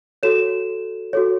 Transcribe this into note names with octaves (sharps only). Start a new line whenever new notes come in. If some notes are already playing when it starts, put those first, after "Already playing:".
F#4 A4 C#5 E7
F#4 A4 C#5